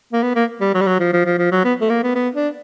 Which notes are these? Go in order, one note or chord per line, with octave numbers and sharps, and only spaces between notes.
A#3
B3
A#3
G3
F#3
G3
F#3
F3
F3
F3
F3
F#3
B3
A3
A#3
B3
B3
D4